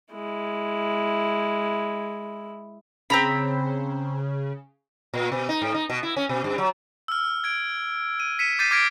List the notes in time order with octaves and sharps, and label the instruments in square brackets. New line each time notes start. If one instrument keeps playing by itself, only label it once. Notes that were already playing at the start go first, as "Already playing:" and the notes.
[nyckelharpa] G#3 E4
[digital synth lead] C#3 [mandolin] C4 A#5 B5
[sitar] A#2
B2
D#4
G#2
D#4
B2
E4
C#4
B2
G2
F#3
[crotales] E6 F6
G#6 D7
D#7
B6 C#7 D#7 E7
D6 G6 A6 B6 C7 D#7
D6 F6 G#6 A#6 B6 D7